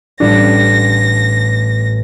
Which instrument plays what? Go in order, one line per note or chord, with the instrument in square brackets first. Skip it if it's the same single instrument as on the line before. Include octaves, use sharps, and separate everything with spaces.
[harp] A1 G3 A4 [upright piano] D4 [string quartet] A#6